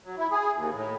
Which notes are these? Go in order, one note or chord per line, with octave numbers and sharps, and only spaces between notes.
F#3
E4
G#4
D#2
A2